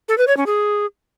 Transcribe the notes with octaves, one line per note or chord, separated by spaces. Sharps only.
A4
B4
C#5
C#4
G#4